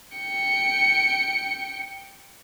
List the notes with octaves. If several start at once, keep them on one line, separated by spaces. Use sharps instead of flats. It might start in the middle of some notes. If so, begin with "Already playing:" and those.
G5 C#7